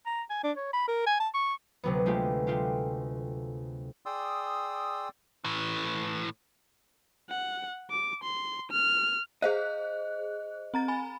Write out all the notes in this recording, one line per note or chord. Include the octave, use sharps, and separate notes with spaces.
A#5
G#5
D4
C#5
B5
A#4
G#5
A5
C#6
D2 C3 F#3 B3
G#3 A3 F4 G4
G#3 A3 F4 G4
G#4 D5 G5 C6 D#6 E6
A2 E3
F#5
D6
C6
F6
G#4 C5 D#5 F5 F#6
C4 A#5 A6
G#5 B5